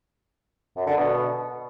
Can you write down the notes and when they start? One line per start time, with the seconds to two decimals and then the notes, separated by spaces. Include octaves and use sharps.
0.76 F#2
0.87 D3
0.97 B2